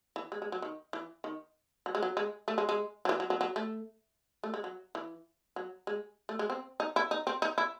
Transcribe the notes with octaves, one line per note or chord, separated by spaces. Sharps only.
E3
G#3
G#3
F#3
D#3
E3
D#3
F#3
G#3
F#3
G#3
A3
G#3
G#3
F#3
E3
F#3
F#3
F#3
A3
A3
G#3
F#3
E3
F#3
G#3
A3
G#3
C4
D#4
E4
D#4
C4
D#4
E4